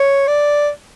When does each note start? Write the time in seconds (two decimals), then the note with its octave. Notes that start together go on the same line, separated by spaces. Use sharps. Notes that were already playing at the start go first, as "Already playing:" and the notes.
Already playing: C#5
0.28 D5